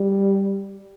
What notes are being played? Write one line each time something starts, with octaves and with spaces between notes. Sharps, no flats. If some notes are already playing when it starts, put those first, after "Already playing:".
Already playing: G3